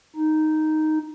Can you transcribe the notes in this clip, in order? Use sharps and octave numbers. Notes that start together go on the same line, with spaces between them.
D#4